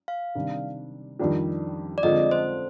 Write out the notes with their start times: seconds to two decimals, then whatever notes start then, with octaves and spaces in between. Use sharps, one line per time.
0.08 F5
0.35 C3 D#3 G3 D4
1.19 F2 D#3 G3 D4 G4
1.98 D5
2.03 D3 F3 G#3 C4 F4 D#5
2.31 C5